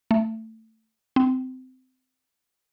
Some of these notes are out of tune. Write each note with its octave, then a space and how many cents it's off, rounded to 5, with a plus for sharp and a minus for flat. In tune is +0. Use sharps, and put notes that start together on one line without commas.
A3 +15
C4 -25